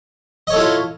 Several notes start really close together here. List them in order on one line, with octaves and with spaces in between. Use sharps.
D#5 C#5 A4 E4 F4